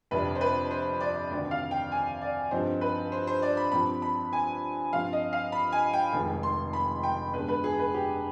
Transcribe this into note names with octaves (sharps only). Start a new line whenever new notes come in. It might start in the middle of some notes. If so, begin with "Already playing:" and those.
G1 F2 C3 G3 D4 B4
C5
B4
C5
D5
D2 C3 D#3 D5
F5
G5
G#5
D5
G2 F3 C4 D#4 C5
B4
C5
C5
D5
B5
G2 F3 C4 B5
B5
G#5
G2 F3 C4 F5
D#5
F5
B5
G#5
G5
F1 F2 D#3 G#3
C6
B5
G5
G2 D3 G#3 B3 B4
B4
G#4
B4
G4